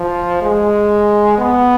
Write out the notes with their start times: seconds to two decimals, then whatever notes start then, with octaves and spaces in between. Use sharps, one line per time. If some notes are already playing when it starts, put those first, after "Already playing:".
Already playing: F3
0.42 G#3
1.38 B3